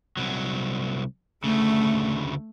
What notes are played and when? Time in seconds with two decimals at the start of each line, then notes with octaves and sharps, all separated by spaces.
0.17 C2 F#3
1.44 D2 C#3 A3